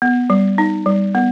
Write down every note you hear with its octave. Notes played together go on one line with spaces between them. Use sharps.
B3
G3
D#4
G3
B3